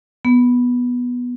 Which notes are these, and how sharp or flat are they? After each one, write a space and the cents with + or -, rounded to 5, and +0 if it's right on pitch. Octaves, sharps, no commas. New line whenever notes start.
B3 -10